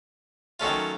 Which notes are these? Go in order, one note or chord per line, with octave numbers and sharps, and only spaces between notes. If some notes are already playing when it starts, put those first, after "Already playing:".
D#3 F#3 A3 C#4 F4